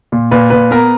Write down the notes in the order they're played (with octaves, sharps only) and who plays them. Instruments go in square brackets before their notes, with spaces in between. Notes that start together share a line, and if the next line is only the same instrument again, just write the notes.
[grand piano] A#2
[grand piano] A#2 [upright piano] B4
[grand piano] A#2 [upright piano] B4
[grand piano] B3 [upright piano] A#4